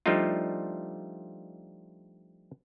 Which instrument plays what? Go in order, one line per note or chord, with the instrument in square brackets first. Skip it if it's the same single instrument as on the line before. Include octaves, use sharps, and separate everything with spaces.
[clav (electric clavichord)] F3 G3 A3 D4 D#4 F4